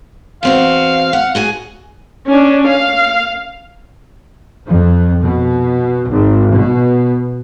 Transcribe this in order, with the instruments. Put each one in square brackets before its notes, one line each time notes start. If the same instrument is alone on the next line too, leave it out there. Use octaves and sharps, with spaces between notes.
[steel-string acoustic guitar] E2 C4 F#4 [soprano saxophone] F5
[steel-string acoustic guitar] F#5
F#4 G#4 G#5
[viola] C#4 D4
F5
[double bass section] F2
B2
G#1
B2